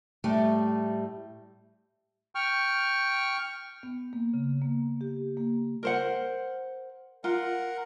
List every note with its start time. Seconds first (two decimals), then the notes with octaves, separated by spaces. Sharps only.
0.24 A2 G3 A3
2.35 G5 C#6 F6
3.83 B3
4.13 A#3
4.34 C#3
4.61 A#3
5.01 G4
5.37 A#3
5.83 A#4 C5 F#5
7.24 F4 A#4 F#5